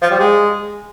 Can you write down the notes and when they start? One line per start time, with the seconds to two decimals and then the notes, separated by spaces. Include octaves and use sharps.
0.02 F3
0.11 G3
0.20 G#3